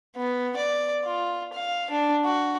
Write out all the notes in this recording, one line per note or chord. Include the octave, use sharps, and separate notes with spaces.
B3
D5
F4
F5
D4
F#4